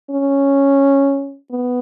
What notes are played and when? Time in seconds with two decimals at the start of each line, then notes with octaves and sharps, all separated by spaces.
0.10 C#4
1.51 B3